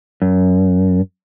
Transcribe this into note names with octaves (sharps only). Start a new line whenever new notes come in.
F#2